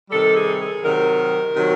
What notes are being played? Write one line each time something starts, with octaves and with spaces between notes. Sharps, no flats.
C3 D#3 G3 A4
G#4
G#4
C3 D#3 F#3 A#4
C3 D#3 F#3